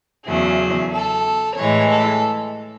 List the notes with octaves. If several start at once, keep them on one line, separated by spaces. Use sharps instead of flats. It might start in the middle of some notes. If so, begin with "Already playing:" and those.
E2 C#3 F#3 A3 G#4
A4
A2 E3 G#3 C#5
A4